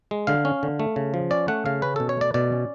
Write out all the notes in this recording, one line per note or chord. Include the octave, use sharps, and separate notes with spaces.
G#3
D3 F5
C#4
D3
A3
C#3
F3
C#4 D5
A3 F#5
C#3 F5
C#4 B4
B2 A4
C#5
A3 D5
B2 D5
C#4